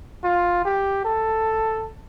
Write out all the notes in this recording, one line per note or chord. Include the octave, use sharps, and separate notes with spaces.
F4
G4
A4